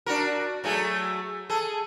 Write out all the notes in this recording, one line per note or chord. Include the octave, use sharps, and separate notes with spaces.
D4 F#4 A#4
F#3 A3 G#4
G#4 A4